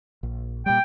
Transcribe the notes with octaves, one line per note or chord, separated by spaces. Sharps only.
A#1
A#2 G3 G5